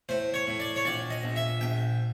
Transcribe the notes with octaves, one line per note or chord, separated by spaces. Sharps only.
A2 C5
C#5
A2
D5
C#5
A#1 D5
D#5
A#1
E5
A#1 G5